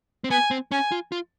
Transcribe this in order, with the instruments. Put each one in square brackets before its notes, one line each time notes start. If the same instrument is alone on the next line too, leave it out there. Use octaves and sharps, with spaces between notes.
[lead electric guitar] C4
[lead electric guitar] B3 [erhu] G#5
[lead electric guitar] C4
[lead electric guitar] C#4 [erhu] G#5
[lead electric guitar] F4
F4